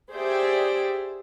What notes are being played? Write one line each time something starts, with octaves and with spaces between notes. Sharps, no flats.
G4 G#4 C5 D5 E5 G5